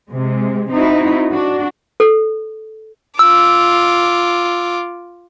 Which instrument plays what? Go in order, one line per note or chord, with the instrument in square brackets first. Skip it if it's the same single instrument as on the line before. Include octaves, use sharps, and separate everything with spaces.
[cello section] C3 G#3
C4 D#4 E4 F#4
D4 F#4
[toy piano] A4
[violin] F4 D6 [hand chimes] E6